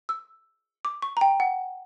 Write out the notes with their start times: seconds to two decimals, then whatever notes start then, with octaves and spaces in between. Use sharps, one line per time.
0.09 E6
0.85 D6
1.02 C#6
1.17 A#5
1.21 G5
1.40 F#5